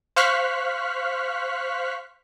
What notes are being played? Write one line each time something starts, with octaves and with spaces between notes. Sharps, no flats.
C5 F5 C#6 F6 F#6 B6